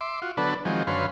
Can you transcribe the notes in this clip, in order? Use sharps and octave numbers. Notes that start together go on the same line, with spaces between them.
E5 C6 D6
F4 F#4
D3 F#3 B3 D4 A4 B4
D#3 F3 F#3 G#3 C4
F#2 D3 C#4 B4 F5 C6